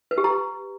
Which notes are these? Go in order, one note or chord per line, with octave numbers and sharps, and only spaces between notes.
B4
G4
A#5